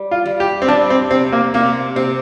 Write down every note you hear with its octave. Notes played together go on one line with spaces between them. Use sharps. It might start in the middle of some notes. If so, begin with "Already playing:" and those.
Already playing: G3
F4
G3
G4
C4
G3 D4
C4
C3 C4
A#3
C3 A#3
C3 C4